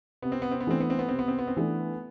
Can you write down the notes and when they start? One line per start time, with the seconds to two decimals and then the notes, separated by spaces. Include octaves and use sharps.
0.22 C3 B3
0.32 C4
0.42 B3
0.51 C4
0.61 B3
0.67 E3 A3 C4 D4
0.81 B3
0.90 C4
0.99 B3
1.09 C3 C4
1.19 B3
1.28 C4
1.39 B3
1.47 C4
1.57 E3 A3 B3 D4